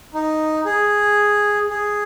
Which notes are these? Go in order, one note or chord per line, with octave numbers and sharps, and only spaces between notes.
D#4
G#4
G#4